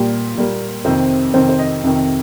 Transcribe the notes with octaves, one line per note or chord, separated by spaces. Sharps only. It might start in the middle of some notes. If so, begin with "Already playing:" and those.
Already playing: A#2 G3 A#3 G4
A#2 G3 A#3
F2 C3 D#3 C4 C5
F2 C3 D#3 C4 C5
C5
D#5
F2 C3 D#3